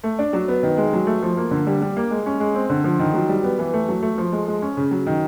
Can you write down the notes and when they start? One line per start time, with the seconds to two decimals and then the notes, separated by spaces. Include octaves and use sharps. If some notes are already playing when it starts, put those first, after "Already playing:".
0.03 A3
0.19 D4
0.33 F#3
0.48 B3
0.63 D#3
0.77 G#3
0.93 F#3
1.07 A3
1.22 F3
1.37 A#3
1.51 D3
1.67 G3
1.82 G3
1.97 A#3
2.11 G#3
2.26 C#4
2.40 G#3
2.55 C4
2.70 D3
2.84 F3
2.99 D#3
3.14 F#3
3.29 G3
3.43 B3
3.59 E3
3.73 A3
3.89 F#3
4.02 A3
4.18 F3
4.32 G#3
4.48 G#3
4.62 C#4
4.77 C#3
4.91 F#3
5.06 D#3